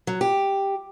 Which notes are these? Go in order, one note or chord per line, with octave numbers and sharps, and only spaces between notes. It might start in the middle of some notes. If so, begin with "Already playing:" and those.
F#3
G4